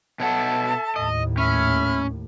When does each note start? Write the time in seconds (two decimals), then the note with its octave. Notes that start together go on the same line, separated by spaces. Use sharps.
0.20 B2 A4 C#5 E5 F#5 A5
0.96 D#2 A2 D#5
1.37 C#4 E5 B5 F6